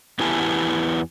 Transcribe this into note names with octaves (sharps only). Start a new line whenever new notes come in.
E2 B3 E4 G4 G#5 A5